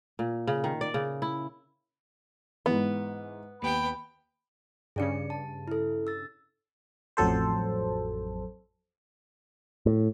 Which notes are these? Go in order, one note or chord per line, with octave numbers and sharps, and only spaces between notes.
A#2
C#3
D#3
D5
C#3
E4
G#2 E3 B3
D#2 B3 G5 B5
G2 C#3 G#4 D5 C#7
A5
E4 A4
E6 A6
A1 F2 F#3 A4 C5
A2